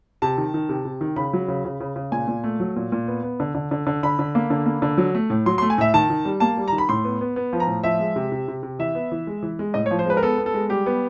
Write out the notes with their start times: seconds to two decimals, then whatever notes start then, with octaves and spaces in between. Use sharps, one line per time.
0.22 C3 A5
0.38 D#3
0.54 D#3
0.69 C3
0.85 C3
1.01 D#3
1.16 C#3 B5
1.33 F#3
1.48 C#3
1.65 C#3
1.80 C#3
1.96 C#3
2.12 A#2 G#5
2.28 A#2
2.44 A3
2.60 F#3
2.76 A#2
2.92 A#2
3.08 B3
3.23 B3
3.40 D3
3.55 D3
3.71 D3
3.87 D3
4.03 D3 B5
4.19 D3
4.35 A#3
4.50 D3
4.66 A#3
4.82 D3
4.98 F#3
5.15 A3
5.30 A2
5.46 F#3 C6
5.58 C6
5.62 A3
5.70 G#5
5.78 A2 E5
5.94 D#3 A5
6.10 D#3
6.25 G3
6.40 A#3 A5
6.57 G3
6.68 D#3 A#5
6.78 B5
6.89 A2 C6
7.04 B3
7.21 B3
7.36 B3
7.53 F3
7.60 A#5
7.67 A2
7.84 F3 E5
7.99 G#3
8.16 C3
8.32 C3
8.48 C3
8.63 C3
8.79 E3 E5
8.95 B3
9.12 E3
9.27 G#3
9.43 E3
9.59 G#3
9.74 A2 D#5
9.86 C#5
9.91 F3
9.99 C5
10.06 G#3 B4
10.17 A#4
10.22 B3 A4
10.38 B3
10.46 A4
10.54 G#3
10.69 G3 G4
10.86 B3